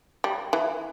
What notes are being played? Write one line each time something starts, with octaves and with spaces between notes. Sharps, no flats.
G3
E3